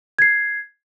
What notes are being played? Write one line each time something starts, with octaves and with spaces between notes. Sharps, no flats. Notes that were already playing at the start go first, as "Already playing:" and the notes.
G#6 C7